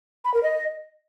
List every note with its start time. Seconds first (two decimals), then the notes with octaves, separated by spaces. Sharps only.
0.25 B5
0.34 A#4
0.43 D#5